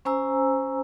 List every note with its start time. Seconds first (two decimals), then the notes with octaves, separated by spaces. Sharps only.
0.05 C#4 C5 G#5 A#5 E6